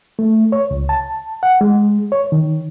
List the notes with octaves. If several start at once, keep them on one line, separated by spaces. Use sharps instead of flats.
A3
C#5
C#2
A5
F#5
G#3
C#5
D#3